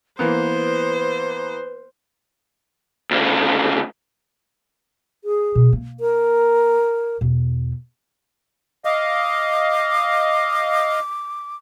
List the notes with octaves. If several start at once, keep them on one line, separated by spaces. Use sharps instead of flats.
E3 A#3 B3 B4 C5
D2 C#3
G#4
B2
A#3
A#4
E2 B2
D#5 F5 D6